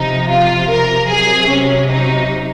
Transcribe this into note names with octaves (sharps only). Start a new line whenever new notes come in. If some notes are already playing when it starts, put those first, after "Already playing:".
Already playing: C3 F3 D#4
F4
A#4
C3 F#3 G#4
C#4
D#4